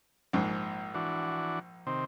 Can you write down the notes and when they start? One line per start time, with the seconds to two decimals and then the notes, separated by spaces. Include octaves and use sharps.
0.33 A#1 G#2
0.94 E3 D4 F#4
1.87 C3 D#3 C4